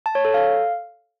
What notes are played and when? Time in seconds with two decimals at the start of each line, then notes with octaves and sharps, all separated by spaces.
0.06 A5
0.15 C#5
0.25 A4
0.34 F5